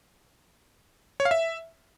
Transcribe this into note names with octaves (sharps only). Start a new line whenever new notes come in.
C#5
F5
E5